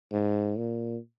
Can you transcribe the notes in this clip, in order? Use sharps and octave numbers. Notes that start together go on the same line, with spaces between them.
G#2
A#2